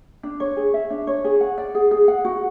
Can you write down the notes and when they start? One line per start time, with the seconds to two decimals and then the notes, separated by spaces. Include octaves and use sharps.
0.23 D4
0.40 C#5
0.57 G#4
0.74 E5
0.90 D4
1.07 C#5
1.24 G#4
1.41 F#5
1.58 D5
1.75 G#4
1.91 G#4
2.08 F#5
2.25 F#4